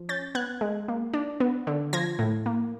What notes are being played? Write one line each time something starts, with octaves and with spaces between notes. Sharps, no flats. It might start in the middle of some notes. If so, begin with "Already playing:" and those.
Already playing: F3
C#4 G6 A6
B3 F#6 G#6
G#3
A#3
D4
B3
D3
F3 G#6 A#6
A2
A#3